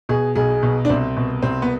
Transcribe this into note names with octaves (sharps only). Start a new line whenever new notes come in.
B2 G#4
B1 G#4
B2
D4
C2 C4
B2
C2 C4
B3